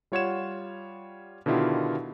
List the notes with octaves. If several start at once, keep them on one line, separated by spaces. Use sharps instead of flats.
G3 F4 C#5 F#5 G#6 E7
B2 D3 D#3 E4 F4 G4